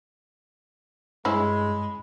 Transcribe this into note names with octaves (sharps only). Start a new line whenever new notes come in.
G2 G#3 C#4 E4 G#4 B5